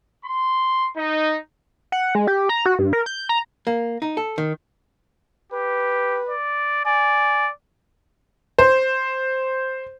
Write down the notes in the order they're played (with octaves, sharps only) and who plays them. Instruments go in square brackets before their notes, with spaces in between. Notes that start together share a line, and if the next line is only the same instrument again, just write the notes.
[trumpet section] C6
D#4
[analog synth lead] F#5
G#3
G4
A#5
F#4
G2
A#4
G6
A#5
[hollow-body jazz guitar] A#3
D#4
A4
D#3
[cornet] G4 [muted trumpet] B4
[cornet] D5
[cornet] D5 [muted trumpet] G#5
[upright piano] C5